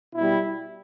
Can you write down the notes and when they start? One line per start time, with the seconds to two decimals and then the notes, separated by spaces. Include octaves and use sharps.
0.15 B2 G3 E4